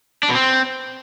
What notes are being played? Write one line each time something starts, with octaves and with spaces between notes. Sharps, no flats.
D4
B2
C4